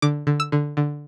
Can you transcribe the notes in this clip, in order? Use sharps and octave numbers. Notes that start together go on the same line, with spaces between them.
D3 D6
D3
E6
D3
D3